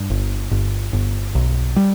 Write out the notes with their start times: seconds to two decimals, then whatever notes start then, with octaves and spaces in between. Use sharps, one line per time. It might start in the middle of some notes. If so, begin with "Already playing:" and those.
Already playing: G2
0.10 G1
0.52 G1
0.93 G1
1.35 B1
1.76 G3